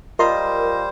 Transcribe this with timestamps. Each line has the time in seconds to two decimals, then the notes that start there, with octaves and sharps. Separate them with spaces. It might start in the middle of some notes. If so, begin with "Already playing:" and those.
0.19 G3 F4 A#4 C5 D#5